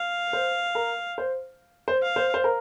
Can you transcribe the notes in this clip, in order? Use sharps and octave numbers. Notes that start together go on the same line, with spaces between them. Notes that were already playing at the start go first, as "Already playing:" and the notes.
Already playing: F5
C5
A#4
C5
C5
F5
C5
C5
A#4